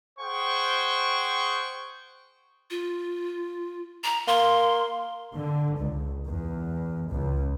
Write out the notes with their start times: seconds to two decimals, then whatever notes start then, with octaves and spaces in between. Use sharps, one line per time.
0.19 G#4 C5 F#5 G5 C#6
2.71 F4
4.04 A#5
4.27 A#3 C6
5.34 D3
5.79 C#2
6.26 E2
7.10 C#2